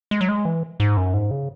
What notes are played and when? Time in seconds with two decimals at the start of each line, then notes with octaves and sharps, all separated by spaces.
0.11 G#3
0.21 F#3
0.29 G#3
0.45 E3
0.80 G#2
0.97 F#2
1.14 G#2
1.31 C#3